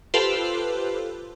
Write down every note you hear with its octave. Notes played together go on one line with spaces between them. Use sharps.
F4 G4 A4 B4 C5